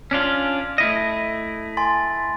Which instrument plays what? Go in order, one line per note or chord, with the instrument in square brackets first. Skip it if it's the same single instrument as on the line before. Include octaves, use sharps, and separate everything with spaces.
[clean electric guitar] C#4 D4 F4
A3 E4 D#5
[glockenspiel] G#5 C6 A6